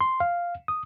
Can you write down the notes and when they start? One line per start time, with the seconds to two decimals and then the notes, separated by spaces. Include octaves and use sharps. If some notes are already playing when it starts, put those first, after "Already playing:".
0.01 C6
0.20 F5
0.68 D#6